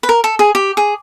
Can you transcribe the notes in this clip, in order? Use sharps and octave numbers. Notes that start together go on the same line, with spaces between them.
B4
A#4
A4
G#4
G4
G#4